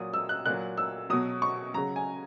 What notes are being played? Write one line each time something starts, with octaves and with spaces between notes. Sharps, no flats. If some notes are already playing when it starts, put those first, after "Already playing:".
Already playing: A#2 F#3 D#6
E6
F#6
A#2 F#3 F#6
E6
B2 F#3 D#6
C#6
C#3 F#3 A#5
G#5